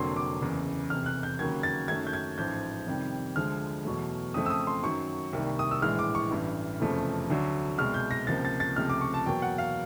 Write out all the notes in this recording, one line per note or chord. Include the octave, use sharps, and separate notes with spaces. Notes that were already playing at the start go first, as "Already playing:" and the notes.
Already playing: F1 F2 D3 F#3 A#3 C6
D6
F#1 E2 C#3
F1 E2 C3 F6
F#6
G6
D#2 C#3 F#3 A#3 G#6
A6
F#2 D#3 F#3 A3 G#6
G6
G#6
A1 G#2 F3 G6
F2 C3 D#3 G3
D2 D3 F3 G#3 F6
E2 B2 F#3 A3
F2 C#3 F3 A3 D#6
E6
D#6
C6
F#2 D#3 F#3 C#6
C2 C3 D#3 G3 A#3
D#6
E6
A#1 A2 E3 G#3 F6
D6
C#6
A1 G2 E3
F1 E2 C#3 F3 A3
D2 D3 F#3
C2 B2 G#3 F6
G6
A#6
C#2 C3 F3 A#3 A6
A6
A6
C#2 C3 F3 A3 F6
D6
C#6
A5
E2 B2 F#3 A#3 G5
F#5
F5